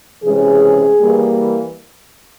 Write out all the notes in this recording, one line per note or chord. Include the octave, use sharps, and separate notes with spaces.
C3 E3 G#3 C#4 G#4
E3 G3 A#3